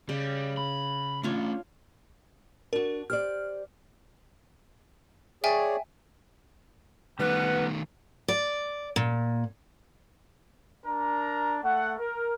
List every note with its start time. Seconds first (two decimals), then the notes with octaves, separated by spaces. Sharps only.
0.09 C#3 G3
0.57 B5
1.23 A3 C#4 D4 F4 C#5
2.73 D4 F#4 A#4
3.10 G4 C5 D5 F6
5.44 G#4 C#5 D5 E5 G5 G#5
7.19 D#3 G3 A3 B3 B4 F#5
8.28 D5
8.96 A#2
10.85 D4 A#4 A#5
11.63 A3 F#5
11.97 A#4